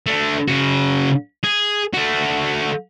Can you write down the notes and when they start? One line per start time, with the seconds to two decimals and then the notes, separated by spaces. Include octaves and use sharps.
0.06 A3 D4
0.48 C#3 F#4
1.44 G#4
1.94 A3 F#4